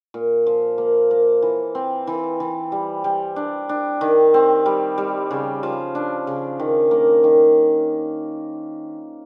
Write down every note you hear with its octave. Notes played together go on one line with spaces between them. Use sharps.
A#2
F3
A#3
A#3
E3
C4
E3
E3
G3
G3
D4
D4
D#3
C4
G3
G3
C#3
F3
D4
C#3
D#3
A#3
D#3